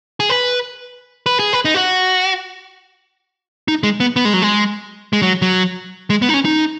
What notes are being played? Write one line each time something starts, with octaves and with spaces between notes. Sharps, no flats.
G#4
B4
B4
G#4
B4
D#4
F#4
D#4
G#3
B3
B3
G#3
F#3
G#3
G#3
F#3
F#3
G#3
B3
D#4
C#4
D#4